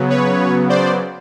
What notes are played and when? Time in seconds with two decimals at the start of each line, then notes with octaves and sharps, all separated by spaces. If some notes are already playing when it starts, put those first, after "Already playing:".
Already playing: C#3 F#3 B3
0.10 B4 C#5
0.69 C5 D5